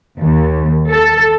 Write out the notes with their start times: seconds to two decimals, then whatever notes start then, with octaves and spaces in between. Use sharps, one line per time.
0.21 D#2
0.90 A4